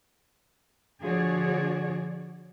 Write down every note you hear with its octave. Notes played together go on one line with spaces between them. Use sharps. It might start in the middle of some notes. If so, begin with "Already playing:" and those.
D3 F3 F#4 G#4 C#5 D5